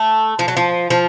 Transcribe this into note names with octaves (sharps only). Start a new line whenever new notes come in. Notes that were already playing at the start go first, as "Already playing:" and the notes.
Already playing: A3
F3
F#3
F3
F3